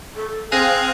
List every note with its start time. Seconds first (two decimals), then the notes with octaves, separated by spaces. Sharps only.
0.15 A4
0.52 C4 G#4 F5 G5 F#6 A#6 F7